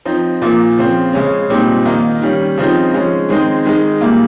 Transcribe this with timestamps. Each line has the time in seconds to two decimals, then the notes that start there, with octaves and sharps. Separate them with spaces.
0.05 F3 C4 D#4
0.42 A#2 F3 A#3
0.78 C#3 F3 C4
1.13 C#3 G#3 C#4
1.50 A#2 G3 C4 D#4
1.85 D#3 A#3 D#4
2.21 D#3 G3 C#4
2.57 C#3 F3 C4 D#4
2.93 F3 G#3 C#4
3.29 D#3 G#3 C4 D#4
3.65 D#3 G#3 D#4
4.01 A#2 G3 A#3